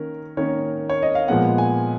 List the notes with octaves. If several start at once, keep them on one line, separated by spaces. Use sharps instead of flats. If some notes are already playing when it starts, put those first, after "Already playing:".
Already playing: D#3 A#3 C#4 A#4
D#3 A#3 C#4 C#5
C#5
D#5
F5
A#2 F3 G#3 B3 F#5
G#5